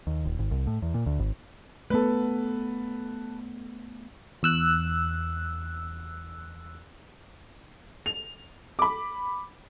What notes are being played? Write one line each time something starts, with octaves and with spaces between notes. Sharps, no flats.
D#2
D#1
G#1
C2
A2
E2
A#2
D2
G#1
A3 B3 A4 B4
E2 E6 F#6
F7
B5 D6